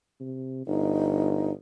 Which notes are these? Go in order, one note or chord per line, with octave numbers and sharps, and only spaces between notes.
C3
G1 D#4